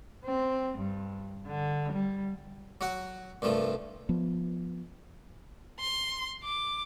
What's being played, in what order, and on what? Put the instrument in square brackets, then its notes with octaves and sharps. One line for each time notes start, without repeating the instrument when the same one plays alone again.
[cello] C4
G2
D3
G3
[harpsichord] F#3 F#4 F#5
C2 G2 F3 A3
[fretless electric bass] F3 B3
[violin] C6
D6